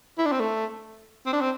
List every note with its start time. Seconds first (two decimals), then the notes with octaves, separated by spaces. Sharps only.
0.18 E4
0.26 D4
0.32 C4
0.40 A3
1.26 C4
1.33 D4
1.41 C4